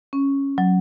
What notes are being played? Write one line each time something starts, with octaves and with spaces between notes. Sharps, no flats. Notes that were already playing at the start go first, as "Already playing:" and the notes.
C#4
F#3